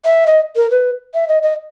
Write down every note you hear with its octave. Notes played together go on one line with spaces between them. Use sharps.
E5
D#5
A#4
B4
E5
D#5
D#5